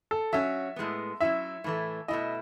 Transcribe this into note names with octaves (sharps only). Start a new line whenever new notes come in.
A4
F#3 C#4 F#4 E5
A2 G#3 B3
F#3 C#4 E4 E5
A2 E3 A3
B2 A3 E4 D#5